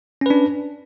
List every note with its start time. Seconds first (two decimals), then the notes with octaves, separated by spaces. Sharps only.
0.21 C#4
0.26 B4
0.30 D4